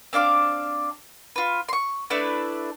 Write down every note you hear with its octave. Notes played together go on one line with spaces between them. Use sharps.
C4 D4 F5 D6
F4 B4
C6 C#6
A3 D4 E4 B4